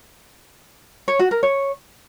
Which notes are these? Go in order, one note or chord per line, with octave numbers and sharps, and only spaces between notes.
C#5
F#4
A#4
C#5